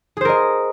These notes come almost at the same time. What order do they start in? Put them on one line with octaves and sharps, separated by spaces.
G#4 C5 A#4 D#5